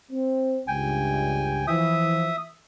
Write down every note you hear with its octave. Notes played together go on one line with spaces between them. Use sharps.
C4
C#2 G2 G5 G#5
E3 F3 E5 D#6